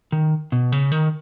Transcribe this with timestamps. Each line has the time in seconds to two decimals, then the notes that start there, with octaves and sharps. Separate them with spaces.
0.12 D#3
0.52 B2
0.72 C#3
0.92 D#3